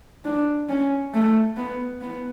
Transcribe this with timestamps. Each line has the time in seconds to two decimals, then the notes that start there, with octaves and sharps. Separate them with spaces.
0.25 D4
0.69 C#4
1.14 A3
1.57 B3
2.01 B3